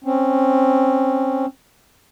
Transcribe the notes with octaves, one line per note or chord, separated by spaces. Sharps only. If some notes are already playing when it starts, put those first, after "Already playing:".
C4 C#4